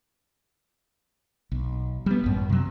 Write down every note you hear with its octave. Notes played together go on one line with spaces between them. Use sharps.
B1
G3 B3
A1 F#2
C3 F#3